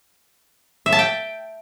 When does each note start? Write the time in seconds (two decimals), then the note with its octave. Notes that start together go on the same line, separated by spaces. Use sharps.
0.86 E5
0.92 A5
0.99 G5